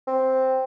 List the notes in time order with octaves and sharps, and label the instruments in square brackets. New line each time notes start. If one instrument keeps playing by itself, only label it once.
[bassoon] C4